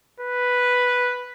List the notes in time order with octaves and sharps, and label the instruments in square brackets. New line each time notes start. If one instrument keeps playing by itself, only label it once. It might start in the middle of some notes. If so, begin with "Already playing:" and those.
[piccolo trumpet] B4